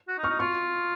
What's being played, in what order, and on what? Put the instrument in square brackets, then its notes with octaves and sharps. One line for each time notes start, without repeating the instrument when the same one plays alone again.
[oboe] F#4
D#4
[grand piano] C#6 F6
[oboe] D#4
[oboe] F4 [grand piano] C#6 F6